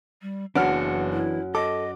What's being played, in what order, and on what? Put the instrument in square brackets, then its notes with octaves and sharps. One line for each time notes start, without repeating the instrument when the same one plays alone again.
[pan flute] G3
[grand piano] F#1 F#4 [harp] F#2 F6 [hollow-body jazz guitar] E3 B3 D4 [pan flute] F#5
[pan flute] E4
[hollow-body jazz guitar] A4 [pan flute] D#5 [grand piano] D6